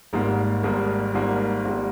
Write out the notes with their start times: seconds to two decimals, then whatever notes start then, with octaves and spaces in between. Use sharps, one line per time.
0.13 G#1 G#2 G3 A#3
0.63 G#1 G#2 G3 A#3
1.14 G#1 G#2 G3 A#3
1.65 G#1 G3 A#3